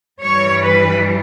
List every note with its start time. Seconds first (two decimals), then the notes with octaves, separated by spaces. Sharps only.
0.21 G2 E3 G3 C#5
0.62 B4